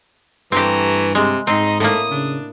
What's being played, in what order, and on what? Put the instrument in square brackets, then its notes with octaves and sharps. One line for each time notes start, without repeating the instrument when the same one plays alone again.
[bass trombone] G2 [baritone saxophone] E3 [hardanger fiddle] A3 A#5 [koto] C4 G4
[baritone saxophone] C3 [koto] G#3
[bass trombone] G#2 [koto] C4 [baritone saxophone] D#4 [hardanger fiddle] D#5 C6
[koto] A2 A#3 [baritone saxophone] A3 [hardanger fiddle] D#6
[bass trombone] C#3 [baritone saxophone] D4